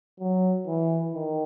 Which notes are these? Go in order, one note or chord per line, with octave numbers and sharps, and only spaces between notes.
F#3
E3
D#3